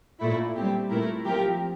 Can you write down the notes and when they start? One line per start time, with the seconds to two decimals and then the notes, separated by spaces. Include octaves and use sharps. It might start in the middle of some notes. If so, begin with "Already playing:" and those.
0.20 A#2 A3 E4
0.55 G3 C4 G4
0.90 A#2 A3 E4 A#4
1.25 F3 C4 G4 A#4